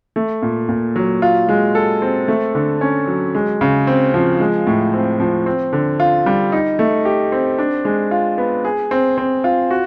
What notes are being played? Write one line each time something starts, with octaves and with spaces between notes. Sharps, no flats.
A3
A#2
A#2
F#3
F4
G#3
A4
C4
A3
D3
C#4
F#3
G#3
C#3
C4
F3
G#3
A2
C4
F3
C4
D3
F4
G3
D#4
A3
G4
C4
D4
G#3
F4
B3
G#4
C4
C4
F4
F#4